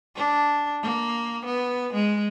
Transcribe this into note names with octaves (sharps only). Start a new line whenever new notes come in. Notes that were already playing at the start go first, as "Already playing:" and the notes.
D4
A#3
B3
G#3